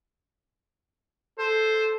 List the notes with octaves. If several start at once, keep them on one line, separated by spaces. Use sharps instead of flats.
A4 C5